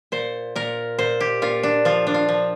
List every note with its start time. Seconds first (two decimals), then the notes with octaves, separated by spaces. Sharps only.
0.12 A#2 C5
0.55 A#2 A#4
0.99 A#2 C5
1.20 G4
1.42 A#2 F4
1.63 D4
1.85 F3 F4
2.07 D4
2.14 F4
2.29 F3